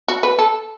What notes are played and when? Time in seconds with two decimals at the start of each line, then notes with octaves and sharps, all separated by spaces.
0.08 F#4
0.23 B4
0.39 A4